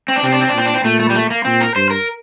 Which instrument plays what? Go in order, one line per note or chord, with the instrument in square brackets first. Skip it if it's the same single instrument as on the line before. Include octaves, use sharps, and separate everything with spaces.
[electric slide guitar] C4
D4
[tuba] C3 [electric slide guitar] C4
[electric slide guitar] D4
C4
D4
[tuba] A#2 [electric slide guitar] C4
[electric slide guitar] D4
C4
[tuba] A#2 [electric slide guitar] A3
[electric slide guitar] A3
G3
A3
A#3
[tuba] A#2 [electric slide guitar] C4
[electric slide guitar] A#4
[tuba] G2 [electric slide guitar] C5
[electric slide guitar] A#4